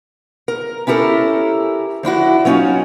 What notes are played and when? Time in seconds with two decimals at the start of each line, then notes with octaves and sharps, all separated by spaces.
0.48 A#4
0.87 C#4 E4 G4 A4 A#4
2.03 F3 D4 E4 F#4
2.45 F#3 B3 C#4 D#4 F4 F#4